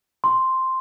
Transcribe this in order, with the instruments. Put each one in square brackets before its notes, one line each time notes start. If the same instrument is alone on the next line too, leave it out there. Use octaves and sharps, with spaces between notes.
[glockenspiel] C6